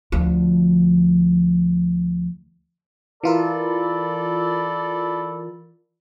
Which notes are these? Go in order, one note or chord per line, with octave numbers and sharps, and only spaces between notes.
D2 F3
E3 F4 A4 A#4 D5 B5